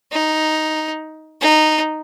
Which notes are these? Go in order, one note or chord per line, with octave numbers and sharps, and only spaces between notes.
D#4
D#4